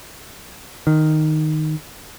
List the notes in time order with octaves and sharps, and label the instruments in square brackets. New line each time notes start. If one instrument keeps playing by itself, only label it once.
[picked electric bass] D#3